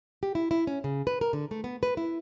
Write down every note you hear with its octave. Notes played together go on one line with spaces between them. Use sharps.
G4
E4
E4
C#4
C#3
B4
A#4
D3
A3
B3
B4
E4